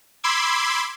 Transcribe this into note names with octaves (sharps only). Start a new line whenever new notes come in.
B5 C6 D6 E6 G#6